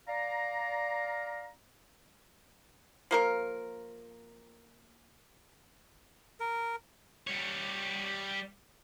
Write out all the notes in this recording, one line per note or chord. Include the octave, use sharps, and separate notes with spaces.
D5 F5 A#5
F3 A#3 A#4
A#4
G3 C#5